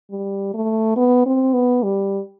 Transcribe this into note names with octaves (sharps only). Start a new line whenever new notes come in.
G3
A3
B3
C4
B3
G3